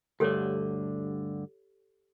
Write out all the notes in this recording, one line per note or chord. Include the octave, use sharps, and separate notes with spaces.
D2 G2 D3 G4 A4 C#5